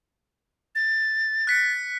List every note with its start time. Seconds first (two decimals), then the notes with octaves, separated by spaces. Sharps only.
0.75 A6
1.47 F#6 B6 C#7